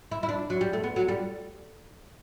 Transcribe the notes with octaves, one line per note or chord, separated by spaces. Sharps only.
E4
E4
D4
F#3
G3
A3
B3
F#3
G3